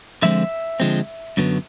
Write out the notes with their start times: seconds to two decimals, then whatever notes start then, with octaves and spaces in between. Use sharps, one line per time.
0.22 D3 F3 G#3 C4 E5
0.80 D3 F3 G#3 C4
1.37 F#2 D3 F#3 B3